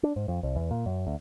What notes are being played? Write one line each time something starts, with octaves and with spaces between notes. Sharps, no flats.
D4
G#2
F2
C2
E2
A#2
F#2
D2